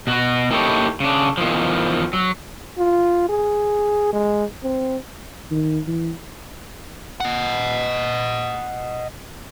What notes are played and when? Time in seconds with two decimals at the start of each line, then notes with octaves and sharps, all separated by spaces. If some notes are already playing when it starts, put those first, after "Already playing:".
0.07 B2 F#4
0.51 A#3 D#4 E4 G4 A4 C#5
1.00 C#3 D4
1.38 E2 D#3 F3
2.13 F#3
2.78 F4
3.29 G#4
4.13 G#3
4.63 C4
5.51 D#3
5.88 E3
7.20 D#5 F#5